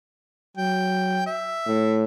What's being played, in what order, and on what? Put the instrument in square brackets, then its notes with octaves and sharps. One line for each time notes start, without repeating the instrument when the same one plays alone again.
[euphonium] F#3 [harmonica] G5
[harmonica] E5
[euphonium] A2